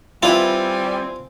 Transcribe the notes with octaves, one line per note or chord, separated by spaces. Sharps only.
G3 C4 E4 F4 B4 G#5